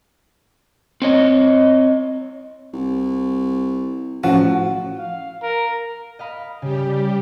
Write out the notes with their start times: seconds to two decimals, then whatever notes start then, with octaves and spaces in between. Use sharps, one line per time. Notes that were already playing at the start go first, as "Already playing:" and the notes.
1.02 C4 C#5 D#5
2.73 C2
4.24 A1 A2 F3 C#4 F#4
4.99 F5
5.42 A#4
6.19 D#5 F5 B5
6.62 C#3 G3 G4